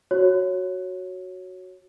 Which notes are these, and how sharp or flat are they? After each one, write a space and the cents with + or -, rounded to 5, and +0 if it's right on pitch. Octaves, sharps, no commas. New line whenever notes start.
F#4 +0 C#5 -5